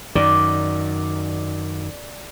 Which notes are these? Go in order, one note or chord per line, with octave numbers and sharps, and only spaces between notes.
F#2 D#3 D5